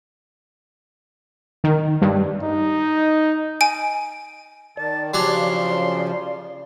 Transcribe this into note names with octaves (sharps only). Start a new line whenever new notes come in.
D#3
G2
D#4
G#5 D7
D#3 D5 A5
C#3 F3 F#3 D4 G4 C6